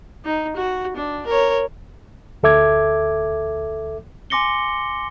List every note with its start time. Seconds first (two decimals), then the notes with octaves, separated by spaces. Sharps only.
0.25 D#4
0.56 F#4
0.96 D4
1.26 A#4 C#5
2.43 D2 A4 E5 D6 G#6
4.30 G#5 C6 D6 A#6 C#7 G7